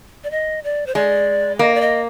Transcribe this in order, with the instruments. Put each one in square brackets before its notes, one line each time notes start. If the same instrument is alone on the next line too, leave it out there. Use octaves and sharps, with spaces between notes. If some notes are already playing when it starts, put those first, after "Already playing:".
[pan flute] D5
D#5
D5
C5
[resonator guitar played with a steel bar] G#3 [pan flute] D5
[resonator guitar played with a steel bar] A#3 [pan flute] D#5
[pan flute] D5
D#5